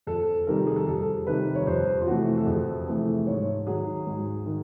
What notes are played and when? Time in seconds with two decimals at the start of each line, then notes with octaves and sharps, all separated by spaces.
0.07 F2 A4
0.47 C3 D#3 G3 A#4
0.57 A4
0.67 G#4
0.76 A4
0.87 F2 A4
1.27 C3 D#3 G3 B4
1.55 C#5
1.67 F2 C5
2.01 F4
2.07 C3 E3 A3 F#4
2.37 A4
2.46 F2 G#4
2.87 C3 E3 A3
3.27 G#2 C#5
3.67 D#3 F#3 G#4
4.07 G#2
4.46 D#3